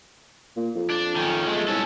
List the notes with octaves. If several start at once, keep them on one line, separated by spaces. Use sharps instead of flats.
A#2
F2
D4
D#3 C#4
G#3 A3
C2 C#4 A4